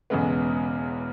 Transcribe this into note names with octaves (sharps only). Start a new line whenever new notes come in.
E1 E2 C#3 G#3 B3